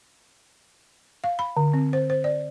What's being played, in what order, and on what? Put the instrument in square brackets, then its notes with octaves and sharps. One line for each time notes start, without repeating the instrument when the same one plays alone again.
[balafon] F5
B5
D3
C4
C5
C5
D5